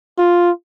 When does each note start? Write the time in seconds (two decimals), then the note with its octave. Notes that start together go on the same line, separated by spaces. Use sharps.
0.18 F4